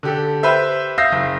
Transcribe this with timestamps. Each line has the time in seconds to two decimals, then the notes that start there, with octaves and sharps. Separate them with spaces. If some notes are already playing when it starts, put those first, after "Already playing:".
0.03 D3 G4 A4
0.43 G4 B4 C5 E5
0.98 E5 F5 D#6 G6 A#6 C7
1.12 F#1